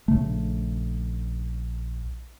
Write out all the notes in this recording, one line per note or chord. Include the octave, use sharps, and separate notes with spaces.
A#1 C#3 A3